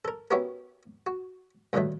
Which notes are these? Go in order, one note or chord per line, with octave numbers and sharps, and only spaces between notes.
A4 A#4
B3 C#4 E4 F#4 G4 A#4
F#4
G2 A#2 D3 D#3 F#3 A3